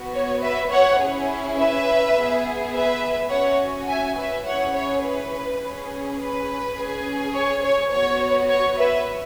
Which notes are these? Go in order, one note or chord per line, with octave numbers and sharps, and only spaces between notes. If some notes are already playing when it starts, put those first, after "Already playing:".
Already playing: B3 F#4
C#5
B4 E5
C#5 F#5
C#4 E4 G#4
B4 E5
B3 G#4
B4 E5
C#4 F#4 C#5 F#5
E5 G#5
B4 E5
C#4 E4 G#4 C#5 F#5
C#5
B4
C#4 G#4
B4
C#4
G#4
C#5
C#5
B3 F#4 C#5
C#5
B4 E5